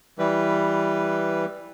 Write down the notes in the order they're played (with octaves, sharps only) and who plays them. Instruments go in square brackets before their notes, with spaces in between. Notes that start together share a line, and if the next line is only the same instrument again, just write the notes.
[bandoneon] E3 G3 B4